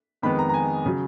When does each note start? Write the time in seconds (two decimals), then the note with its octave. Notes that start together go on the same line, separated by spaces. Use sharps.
0.22 F2 D#3 G#3 B3 B5
0.39 A#5
0.49 A#5
0.54 G#5
0.86 C#3 F#3